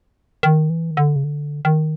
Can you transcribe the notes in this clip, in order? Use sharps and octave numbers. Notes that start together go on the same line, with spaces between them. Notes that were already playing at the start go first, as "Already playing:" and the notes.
D#3
E3
D#3
D3
C#3
D3
D#3